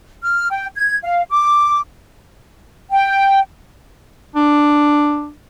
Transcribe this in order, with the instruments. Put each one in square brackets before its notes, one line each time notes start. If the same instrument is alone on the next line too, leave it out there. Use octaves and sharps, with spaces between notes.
[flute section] F6
G5
G#6
F5
D6
G5
[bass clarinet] D4